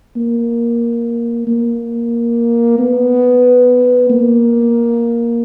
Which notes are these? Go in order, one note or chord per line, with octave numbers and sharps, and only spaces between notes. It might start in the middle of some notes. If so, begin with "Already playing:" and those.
A#3
A#3
B3
A#3